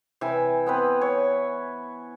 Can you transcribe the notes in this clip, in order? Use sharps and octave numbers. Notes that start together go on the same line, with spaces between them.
C3 E3 E5 G#5
B3 C4 B4
C#5